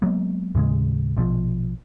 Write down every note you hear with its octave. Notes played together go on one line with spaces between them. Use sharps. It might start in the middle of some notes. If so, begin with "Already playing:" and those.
F#3 G#3 A#3 B3
D#2 A2 C#3 G#3
A#1 B2 F3